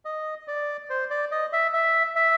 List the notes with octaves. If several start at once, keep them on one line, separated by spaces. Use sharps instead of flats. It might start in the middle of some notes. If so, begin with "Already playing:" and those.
D#5
D5
C5
D5
D#5
E5
E5
E5